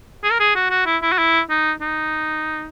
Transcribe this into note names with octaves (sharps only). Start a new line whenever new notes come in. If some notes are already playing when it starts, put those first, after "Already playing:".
G#4
A#4
G#4
F#4
F#4
E4
E4
F#4
E4
D#4
D#4